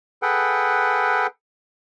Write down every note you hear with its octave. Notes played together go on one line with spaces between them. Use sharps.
G#4 A4 B4 F#5 G5